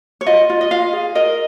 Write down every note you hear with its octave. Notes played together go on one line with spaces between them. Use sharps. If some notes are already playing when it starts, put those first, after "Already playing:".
C#5
F4 D#5
F4
D#5
F4 F5
G#4
A#4 D#5